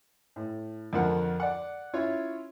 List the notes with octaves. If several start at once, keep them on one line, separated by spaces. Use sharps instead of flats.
A2
F2 D3 F3 A#4 F#5
D5 F#5
C#4 E4 F4 C#5